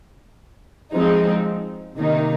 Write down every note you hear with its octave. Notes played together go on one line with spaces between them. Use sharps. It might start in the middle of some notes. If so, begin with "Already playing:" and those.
F3 G#3 C4 D#4
C3 D#3 A#3 D#4